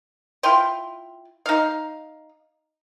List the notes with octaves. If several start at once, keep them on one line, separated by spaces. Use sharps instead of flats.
E4 F4 G5 C6
D#4 F5